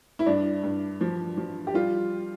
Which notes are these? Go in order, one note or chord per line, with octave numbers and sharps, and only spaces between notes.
E4
G2 D4
G2
F3
F3
G4
G3 F4